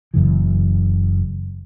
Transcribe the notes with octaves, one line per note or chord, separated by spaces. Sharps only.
F#1 F#2 C#3 E3